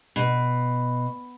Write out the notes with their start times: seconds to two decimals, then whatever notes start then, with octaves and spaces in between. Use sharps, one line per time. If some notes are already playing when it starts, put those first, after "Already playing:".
0.16 B2